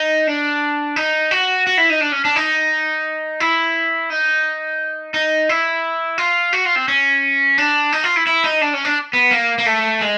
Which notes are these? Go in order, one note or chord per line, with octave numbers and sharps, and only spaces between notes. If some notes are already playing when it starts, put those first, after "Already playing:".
Already playing: D#4
D4
D#4
F#4
F#4
E4
D#4
D4
C#4
D4
D#4
E4
D#4
D#4
E4
F4
F#4
F4
C4
C#4
D4
D#4
F4
E4
E4
D#4
D4
C#4
D4
B3
A#3
A#3
A3
G#3